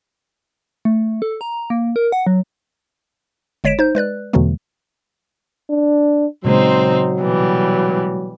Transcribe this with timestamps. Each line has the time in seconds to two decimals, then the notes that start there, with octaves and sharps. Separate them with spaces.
0.85 A3
1.22 A4
1.41 A#5
1.70 A#3
1.96 A#4
2.12 F#5
2.27 F#3
3.64 G1 G#3 C#5 B6 D7 E7
3.79 D#4 C5 G6
3.95 G#3 B4 D5 F#6
4.33 E2 B2 D3 E3 F#3 A3
5.70 D4
6.45 A#2 C#3 F#3 G#3 C4 D#4 C5
7.20 B2 E3 G3